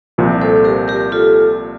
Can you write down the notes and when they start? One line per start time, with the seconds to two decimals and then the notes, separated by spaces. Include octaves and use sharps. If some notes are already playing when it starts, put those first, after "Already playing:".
0.18 C2 A#2 F3
0.41 A4 C5
0.64 G4 A#4
0.88 G4 A#4
1.12 F4 A4